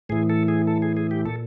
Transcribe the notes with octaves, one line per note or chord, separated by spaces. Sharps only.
A2 E3 G#4
A4
G#4
A4
G#4
G#4
G4
A#2 A4